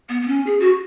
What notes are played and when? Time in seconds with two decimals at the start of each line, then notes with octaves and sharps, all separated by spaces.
0.09 B3
0.22 B3
0.28 C#4
0.46 G#4
0.60 F#4